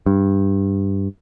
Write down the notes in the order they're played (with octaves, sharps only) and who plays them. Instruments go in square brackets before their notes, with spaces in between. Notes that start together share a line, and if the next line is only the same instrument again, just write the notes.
[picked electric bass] G2